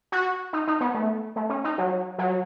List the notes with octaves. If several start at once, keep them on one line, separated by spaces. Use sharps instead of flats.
F#4
D#4
D#4
B3
A3
A3
C#4
D#4
F#3
F#3